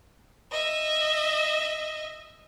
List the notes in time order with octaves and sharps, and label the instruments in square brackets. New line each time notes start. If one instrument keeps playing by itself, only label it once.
[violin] D#5 E5